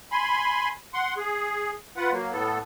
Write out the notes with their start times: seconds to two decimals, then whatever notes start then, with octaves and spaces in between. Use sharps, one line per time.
0.12 G#5 B5 C6
0.94 F#5 C6
1.17 G#4
1.97 F4 B4 F#5
2.12 F#3 A#3
2.32 A2 B3 A4